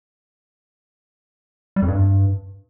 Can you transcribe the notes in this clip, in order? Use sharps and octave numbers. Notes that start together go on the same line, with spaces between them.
G3
F2
G2